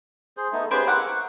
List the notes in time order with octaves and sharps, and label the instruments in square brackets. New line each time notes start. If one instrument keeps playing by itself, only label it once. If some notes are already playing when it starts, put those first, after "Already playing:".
[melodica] G#4 C5
A3 B3 D#4
[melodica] B3 C#4 B4 [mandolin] G4 G#4 C5
[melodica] E4 A#4 D6 [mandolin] F#5
[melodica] C#6